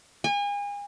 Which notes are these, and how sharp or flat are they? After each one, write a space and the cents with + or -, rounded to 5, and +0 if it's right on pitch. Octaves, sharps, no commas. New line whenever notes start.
G#5 -35